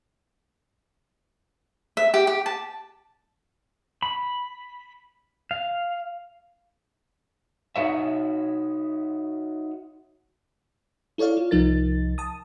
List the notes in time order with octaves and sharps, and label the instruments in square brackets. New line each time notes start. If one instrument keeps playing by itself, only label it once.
[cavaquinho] E5
G4
G4
A5
[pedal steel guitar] B5
F5
[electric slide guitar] D#4 E4 F#4 C#5 E5
[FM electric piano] E4 A4 C#5 D5 F5
F4
C2 F3 D#4 A#4 A6
A5 D#6